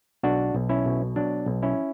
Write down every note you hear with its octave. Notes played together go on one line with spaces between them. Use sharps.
B1 D4 F#4
B1
C#4 E4
B2
F#3 D4
B1
C#4 E4